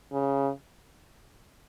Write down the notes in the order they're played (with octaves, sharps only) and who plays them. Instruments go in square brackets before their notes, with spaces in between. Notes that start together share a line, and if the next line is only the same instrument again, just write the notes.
[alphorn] C#3